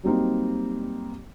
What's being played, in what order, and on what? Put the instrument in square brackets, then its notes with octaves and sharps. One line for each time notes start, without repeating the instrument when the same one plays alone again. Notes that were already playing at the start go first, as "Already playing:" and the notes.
[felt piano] F#3 G3 A#3 C4 D#4